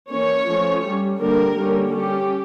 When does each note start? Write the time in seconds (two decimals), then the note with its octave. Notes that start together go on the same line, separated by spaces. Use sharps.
0.10 E3 A#3 C#4 C#5
0.46 F3 A3 C#4
0.83 G3 C#4
1.19 D3 G3 A#3 D4 A#4
1.55 D3 G3 A#3 C#4
1.92 G3 C#4 G4